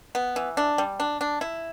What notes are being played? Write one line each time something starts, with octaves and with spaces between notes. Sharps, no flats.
B3
E3
D4
G3
D4
D4
E4